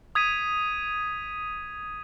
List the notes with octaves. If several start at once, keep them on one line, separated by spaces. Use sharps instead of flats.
D#6 G#6 B6 D#7